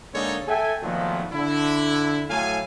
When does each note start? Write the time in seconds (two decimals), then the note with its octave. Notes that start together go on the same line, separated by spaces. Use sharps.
0.14 D3 G#3 A#3 D#4 A4 C#5
0.48 A4 E5 G5 G#5
0.82 A#2 D#3 F3 F#3 A3 B3
1.32 D3 E4
2.29 A2 F#3 A3 F5 G#5